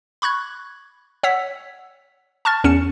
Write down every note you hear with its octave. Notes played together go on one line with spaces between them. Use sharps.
B5 C#6 F#6 G#6
C#5 F#5 E6 B6
A5 C#6 F6 A6
E2 C#4 C#7 E7